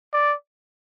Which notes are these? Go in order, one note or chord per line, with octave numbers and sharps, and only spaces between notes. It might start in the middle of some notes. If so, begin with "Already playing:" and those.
D5